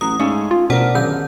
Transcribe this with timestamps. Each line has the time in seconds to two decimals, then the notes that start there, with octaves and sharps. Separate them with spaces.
0.01 A1 F#3 D#6
0.19 G#2 A3 C#4 F5
0.51 F4
0.70 A1 B2 D4 A#4 C5 F#5 F6
0.95 F#2 D3 D#3 G6